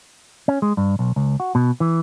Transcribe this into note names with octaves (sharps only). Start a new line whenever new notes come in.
C#4
G#3
G2
B1
C#2
F#4
B2
E3